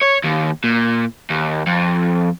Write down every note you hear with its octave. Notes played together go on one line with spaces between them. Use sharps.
C#5
D#2
A#2
D#2
F2